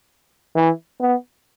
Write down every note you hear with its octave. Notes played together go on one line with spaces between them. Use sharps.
E3
B3